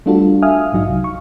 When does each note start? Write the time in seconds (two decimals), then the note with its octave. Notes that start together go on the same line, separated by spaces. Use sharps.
0.06 G3 A3 D4 F4 F#4 A4
0.43 E5 F5 G#5 D#6 F6
0.72 A#1 G#2 F#3 D#4 F5
0.88 C2
1.04 C#6